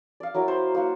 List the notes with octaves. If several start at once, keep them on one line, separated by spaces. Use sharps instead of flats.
D5 F5
F#3 E4 A#4 F5
C5 B5
A#3 E4 F5 F#5